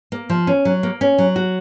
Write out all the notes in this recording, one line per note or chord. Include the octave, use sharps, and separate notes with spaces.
A#3
F3
C#4
F#3
A#3
C#4
F#3
F#4